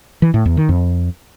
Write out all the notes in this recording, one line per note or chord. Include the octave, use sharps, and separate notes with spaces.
E3
A2
E2
D#3
F2